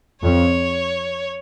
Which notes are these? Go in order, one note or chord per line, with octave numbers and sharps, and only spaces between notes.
F2 C#5